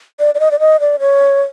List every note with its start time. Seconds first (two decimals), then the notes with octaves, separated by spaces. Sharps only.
0.20 D5
0.35 D5
0.40 D#5
0.51 D5
0.60 D#5
0.80 D5
1.00 C#5